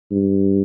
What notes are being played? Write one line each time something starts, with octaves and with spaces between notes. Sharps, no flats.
G2